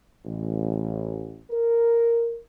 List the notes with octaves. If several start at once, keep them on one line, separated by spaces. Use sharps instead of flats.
A1
A#4